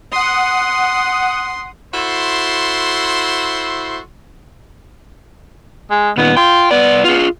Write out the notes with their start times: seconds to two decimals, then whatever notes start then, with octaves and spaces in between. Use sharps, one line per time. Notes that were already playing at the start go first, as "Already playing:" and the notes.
0.12 F#5 C6 D#6
1.92 E4 F#4 A4 C5 C6
5.90 G#3
6.17 A#2 D#3 B3
6.37 F4 G5
6.71 C2 B3 D5
7.04 F4 G#4